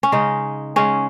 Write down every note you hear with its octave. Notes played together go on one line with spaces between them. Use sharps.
C#4
C#3 G#3 D#4
C#3 G#3 C#4